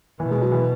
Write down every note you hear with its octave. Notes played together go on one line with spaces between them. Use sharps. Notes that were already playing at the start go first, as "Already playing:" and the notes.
B2 E3
G#3
F#3
E3